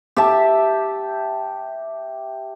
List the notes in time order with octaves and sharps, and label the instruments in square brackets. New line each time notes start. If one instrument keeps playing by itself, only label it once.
[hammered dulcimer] G4 E5 A5